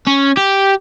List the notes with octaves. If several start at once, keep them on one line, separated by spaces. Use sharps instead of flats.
C#4
G4